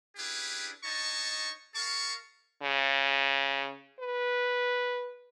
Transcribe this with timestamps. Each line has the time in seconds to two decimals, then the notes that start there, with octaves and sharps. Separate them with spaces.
0.16 C#4 D4 E4 G4 G#4 B4
0.84 D4 D#4 C#5 D#5 A5 C#6
1.75 G#4 A#4 F5 A5 C#6
2.62 C#3
4.00 B4